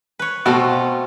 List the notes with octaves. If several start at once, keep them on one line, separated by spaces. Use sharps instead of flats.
B4 C#5
B2 A3 C4 F4